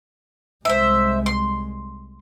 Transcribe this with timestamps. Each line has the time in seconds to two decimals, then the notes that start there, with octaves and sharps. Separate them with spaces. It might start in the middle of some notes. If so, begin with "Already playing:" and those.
0.65 C2 G#3 C5 E5
1.26 C6